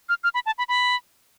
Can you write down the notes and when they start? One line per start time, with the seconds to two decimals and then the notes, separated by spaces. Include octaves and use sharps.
0.09 F6
0.24 F6
0.34 B5
0.46 A5
0.58 B5
0.69 B5